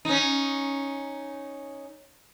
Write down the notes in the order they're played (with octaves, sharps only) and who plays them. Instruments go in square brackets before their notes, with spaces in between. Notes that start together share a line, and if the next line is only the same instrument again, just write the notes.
[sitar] C#4 D#4